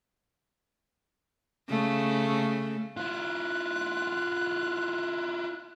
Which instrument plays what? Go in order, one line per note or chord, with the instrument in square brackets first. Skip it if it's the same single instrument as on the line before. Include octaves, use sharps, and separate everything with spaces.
[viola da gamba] C#3 A3
[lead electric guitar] E4 F4 [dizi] F#6